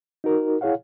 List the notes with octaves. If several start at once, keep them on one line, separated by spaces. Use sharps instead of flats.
D#4 F#4 A#4
E4 G#4 C#5 F5 F#5